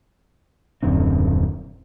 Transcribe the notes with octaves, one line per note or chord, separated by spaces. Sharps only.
D#1 F#2 D3 C4